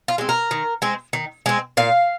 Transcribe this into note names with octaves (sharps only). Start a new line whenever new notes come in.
F4
G#3 C4
A#4
D#3
G#3 C4
D#3
G#3 C4
A#2 F5